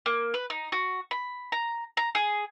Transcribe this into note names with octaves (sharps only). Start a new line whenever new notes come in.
A#3
B4
D#4
F#4
B5
A#5
A#5
G#4